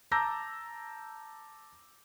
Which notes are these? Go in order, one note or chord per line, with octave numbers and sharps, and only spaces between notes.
A5 A#5 D6 E6 G6 A#6